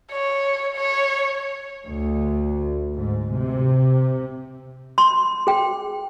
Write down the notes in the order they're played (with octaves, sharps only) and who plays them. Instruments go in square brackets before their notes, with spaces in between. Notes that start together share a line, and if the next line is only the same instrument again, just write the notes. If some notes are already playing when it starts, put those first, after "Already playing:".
[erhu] C#5
C#5
[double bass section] D2
G#2
C3
[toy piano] C6
G#4 G5